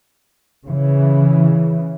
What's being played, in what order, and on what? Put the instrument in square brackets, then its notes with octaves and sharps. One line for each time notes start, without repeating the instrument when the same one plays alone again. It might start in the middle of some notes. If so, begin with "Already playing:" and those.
[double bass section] C#3 E3